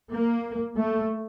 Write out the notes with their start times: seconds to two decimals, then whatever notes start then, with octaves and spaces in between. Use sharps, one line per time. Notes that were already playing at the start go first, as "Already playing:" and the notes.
0.11 A#3
0.77 A3